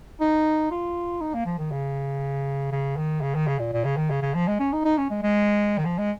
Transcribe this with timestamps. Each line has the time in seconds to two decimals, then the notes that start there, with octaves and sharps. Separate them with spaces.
0.21 D#4
0.71 F4
1.21 D#4
1.34 A#3
1.46 F3
1.59 D#3
1.71 C#3
2.72 C#3
2.97 D#3
3.22 C#3
3.35 D#3
3.48 C#3
3.59 A#2
3.73 A#2
3.85 C#3
3.97 D#3
4.10 C#3
4.22 C#3
4.34 F3
4.48 G#3
4.60 C#4
4.73 D#4
4.85 D#4
4.98 C#4
5.11 G#3
5.23 G#3
5.78 D#3
5.85 F3
5.98 G#3